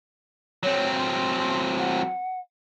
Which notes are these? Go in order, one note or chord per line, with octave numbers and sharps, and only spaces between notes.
F#3 C4 C#5
C6
F#5